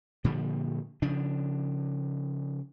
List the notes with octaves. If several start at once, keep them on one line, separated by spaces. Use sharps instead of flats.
A#2 D3 F3 G3
C#3 F3 D4